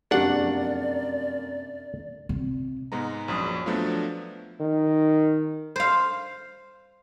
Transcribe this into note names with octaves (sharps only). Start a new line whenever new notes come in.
F1 F#2 A#3 D4 G4 G#4 D5 F#5
C3
G#2 G#3 B3 A#5
A#1 F#2 D#6
F3 F#3 A3 B3 D4 F4
D#3
C5 F5